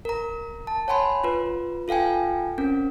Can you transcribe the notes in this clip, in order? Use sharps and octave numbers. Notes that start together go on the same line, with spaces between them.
A#4 A#5
A5
C#5 F#5 G#5 B5 C6
F4 B4
F4 A4 F5 G5 G#5
C4 C#4 A#4